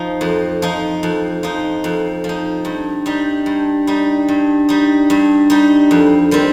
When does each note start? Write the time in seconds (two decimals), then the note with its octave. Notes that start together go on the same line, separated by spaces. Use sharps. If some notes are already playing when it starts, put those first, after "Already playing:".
Already playing: F3 D#4
0.21 F2
0.62 F3 D#4
1.03 F2
1.43 F3 D#4
1.84 F2
2.24 F3
2.29 D#4
2.65 G2
3.06 G3 D#4
3.46 G2
3.87 G3 D#4
4.28 G2
4.69 G3 D#4
5.10 G2
5.50 G3 D#4
5.91 F2
6.31 D#3 G3 C4